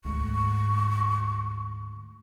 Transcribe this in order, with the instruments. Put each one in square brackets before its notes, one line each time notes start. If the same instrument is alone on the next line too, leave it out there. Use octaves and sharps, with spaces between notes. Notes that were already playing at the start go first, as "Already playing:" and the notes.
[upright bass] D2 G#2 [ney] C#6